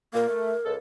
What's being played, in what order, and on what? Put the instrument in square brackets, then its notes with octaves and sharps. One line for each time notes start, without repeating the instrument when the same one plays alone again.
[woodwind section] A#2 A#3 [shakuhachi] A#4
[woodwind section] A3
C#2 A4